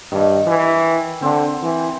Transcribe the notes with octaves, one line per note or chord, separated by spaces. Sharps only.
G2 D#3
E3
D3 C4
E3